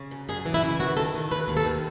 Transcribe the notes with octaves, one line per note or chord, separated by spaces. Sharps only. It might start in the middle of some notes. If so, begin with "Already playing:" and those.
Already playing: C#3
F#2
F#2 G#4
E3
E4
C#3
D#2 F#4
D#3 A4
D#3
D#2 B4
D#2
A4
D#3